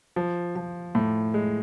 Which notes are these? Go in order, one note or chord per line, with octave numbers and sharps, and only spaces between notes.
F3
F3
A2
G#3